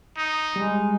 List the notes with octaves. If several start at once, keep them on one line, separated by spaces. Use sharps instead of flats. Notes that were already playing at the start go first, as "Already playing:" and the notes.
D#4
G3 G#3